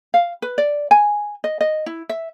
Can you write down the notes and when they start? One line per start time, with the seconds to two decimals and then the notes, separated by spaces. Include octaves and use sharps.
0.14 F5
0.42 B4
0.58 D5
0.91 G#5
1.44 D#5
1.61 D#5
1.86 E4
2.09 E5